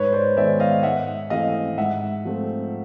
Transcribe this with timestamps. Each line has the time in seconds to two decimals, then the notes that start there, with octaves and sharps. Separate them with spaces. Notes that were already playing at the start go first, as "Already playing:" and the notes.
Already playing: G#2 B4 C#5
0.13 C5 D5
0.37 D#3 G#3 B3 D5 E5
0.60 D#5 F5
0.83 G#2 E5 F#5
1.30 E3 A3 C4 D#5 F5
1.77 G#2 E5 F#5
2.25 F3 A3 C4